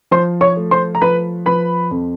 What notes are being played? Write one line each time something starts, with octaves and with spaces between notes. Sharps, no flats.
F3 C5 C6
C#5 C#6
A3
C5 C6
A#5
F3 B4 B5
F3 B4 B5
F2